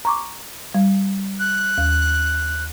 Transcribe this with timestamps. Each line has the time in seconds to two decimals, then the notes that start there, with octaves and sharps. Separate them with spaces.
0.05 A#5 C#6 D6
0.74 G3
1.39 F#6
1.78 D#2